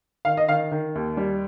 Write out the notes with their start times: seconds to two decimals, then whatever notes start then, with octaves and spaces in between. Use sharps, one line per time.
0.25 D#3 F5
0.37 D#5
0.48 D#3 F5
0.72 D#3
0.95 D#2
1.17 G3